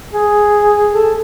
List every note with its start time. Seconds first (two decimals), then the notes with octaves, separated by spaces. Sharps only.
0.13 G#4
0.92 A4